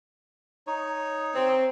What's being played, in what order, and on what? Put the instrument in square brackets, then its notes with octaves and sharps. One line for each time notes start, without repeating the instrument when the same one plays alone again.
[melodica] D#4 C#5
[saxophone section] C4